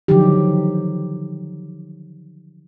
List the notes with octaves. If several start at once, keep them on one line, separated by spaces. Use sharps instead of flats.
D3 D#3 F3 F#3 D#4 G4